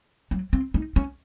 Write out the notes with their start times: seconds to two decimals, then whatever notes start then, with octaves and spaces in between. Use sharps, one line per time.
0.31 F#3
0.53 C4
0.74 D#4
0.96 C#4